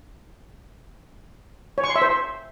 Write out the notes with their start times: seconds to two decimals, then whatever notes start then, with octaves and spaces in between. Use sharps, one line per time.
1.78 C#5
1.84 C#6
1.90 C6
1.96 E5
2.02 C5